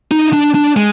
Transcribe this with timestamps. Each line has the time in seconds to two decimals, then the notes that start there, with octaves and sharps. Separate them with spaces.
0.11 D#4
0.33 D4
0.55 D4
0.77 G#3